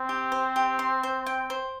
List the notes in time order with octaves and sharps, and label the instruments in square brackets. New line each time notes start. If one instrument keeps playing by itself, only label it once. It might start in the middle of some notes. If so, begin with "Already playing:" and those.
Already playing: [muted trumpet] C4
[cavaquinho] G4
C5
G4
C6
C5
G5
C5